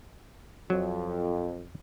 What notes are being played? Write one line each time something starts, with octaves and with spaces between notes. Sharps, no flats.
F2 F#3